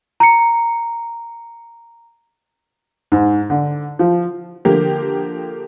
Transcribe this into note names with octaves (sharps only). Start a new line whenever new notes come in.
A#5 C#7
G#2
D3
F3
D3 F3 A#3 G4